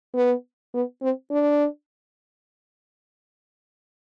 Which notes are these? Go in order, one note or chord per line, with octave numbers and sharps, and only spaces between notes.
B3
B3
C4
D4